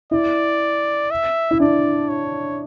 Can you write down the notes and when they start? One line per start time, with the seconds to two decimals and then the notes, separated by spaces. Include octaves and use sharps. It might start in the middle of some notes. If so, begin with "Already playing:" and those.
0.11 E4 D5
1.11 E5
1.51 E4
1.60 D4 D5
2.09 C#5